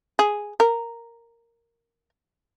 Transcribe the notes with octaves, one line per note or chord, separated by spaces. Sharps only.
G#4
A#4